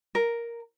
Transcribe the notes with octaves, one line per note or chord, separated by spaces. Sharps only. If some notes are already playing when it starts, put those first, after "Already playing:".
A#4